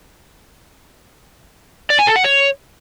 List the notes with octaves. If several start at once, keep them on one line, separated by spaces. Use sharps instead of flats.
D5
G#5
A4
F#5
C#5